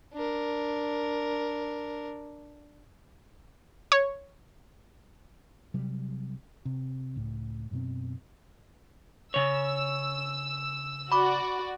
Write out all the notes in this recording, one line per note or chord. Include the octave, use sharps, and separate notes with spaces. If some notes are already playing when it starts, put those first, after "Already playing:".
D4 A#4
C#5
C3 F#3 G3
C3
C#2 A2
F#2 B2 C4
C#3 C#5 E6
F#4 D5 B5 D6